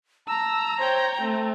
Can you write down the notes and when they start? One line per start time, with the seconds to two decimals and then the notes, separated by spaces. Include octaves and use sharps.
0.28 A5 A#5 E6
0.79 C5 C#5 G5
1.22 A3 C4